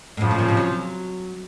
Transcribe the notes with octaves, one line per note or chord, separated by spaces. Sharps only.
A2
F#2 C#3 F3
A2
A#2
C3
F#3